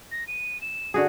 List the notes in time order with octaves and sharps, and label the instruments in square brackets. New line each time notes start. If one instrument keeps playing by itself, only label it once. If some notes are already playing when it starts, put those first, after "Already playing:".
[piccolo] A#6
D#7
E7
[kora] D3 F#4 G#4